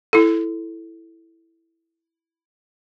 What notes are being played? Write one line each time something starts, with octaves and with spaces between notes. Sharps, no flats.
E4 A4